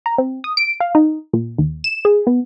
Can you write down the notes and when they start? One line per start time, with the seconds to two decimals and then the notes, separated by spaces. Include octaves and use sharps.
0.06 A#5
0.18 C4
0.44 D#6
0.57 D7
0.80 F5
0.95 D#4
1.33 A#2
1.58 D#2
1.84 E7
2.05 G#4
2.27 B3